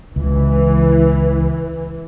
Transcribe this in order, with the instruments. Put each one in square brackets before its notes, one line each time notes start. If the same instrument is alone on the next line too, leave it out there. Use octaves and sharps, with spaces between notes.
[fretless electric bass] C#2 [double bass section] E3